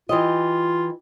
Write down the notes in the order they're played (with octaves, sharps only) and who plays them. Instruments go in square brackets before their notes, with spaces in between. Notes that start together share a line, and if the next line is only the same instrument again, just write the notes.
[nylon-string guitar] E3 G4 D#5 [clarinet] F4